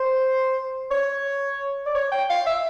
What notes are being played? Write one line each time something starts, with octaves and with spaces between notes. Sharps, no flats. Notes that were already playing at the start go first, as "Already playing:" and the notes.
Already playing: C5
C#5
D5
C#5
G5
F5
E5